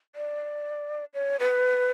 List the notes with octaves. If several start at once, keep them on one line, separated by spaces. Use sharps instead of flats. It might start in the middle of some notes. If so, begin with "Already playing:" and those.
D5
C#5
B4